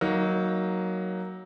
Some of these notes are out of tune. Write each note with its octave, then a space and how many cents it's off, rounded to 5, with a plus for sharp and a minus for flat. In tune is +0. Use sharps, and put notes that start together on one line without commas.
F#3 +10 A#3 +0 D#4 +20